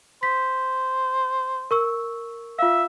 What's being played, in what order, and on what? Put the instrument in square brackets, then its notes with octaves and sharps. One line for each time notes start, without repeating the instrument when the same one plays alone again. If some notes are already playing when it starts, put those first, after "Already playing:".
[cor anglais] C5 [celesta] B6
[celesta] A#4 C#6 E6
[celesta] F4 F5 [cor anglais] E5